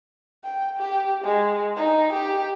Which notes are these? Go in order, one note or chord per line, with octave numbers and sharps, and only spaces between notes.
G5
G4
G#3
D#4
G4